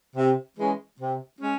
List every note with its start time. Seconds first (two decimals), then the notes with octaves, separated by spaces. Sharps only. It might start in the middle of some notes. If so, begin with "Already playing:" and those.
0.16 C3
0.57 E3 G#3 C#4
1.00 C3
1.40 G#3 C#4